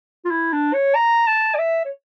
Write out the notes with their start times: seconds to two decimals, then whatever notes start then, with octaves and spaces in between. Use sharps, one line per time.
0.25 F4
0.31 E4
0.53 D4
0.73 C#5
0.95 A#5
1.27 A5
1.55 D5
1.59 E5
1.85 C#5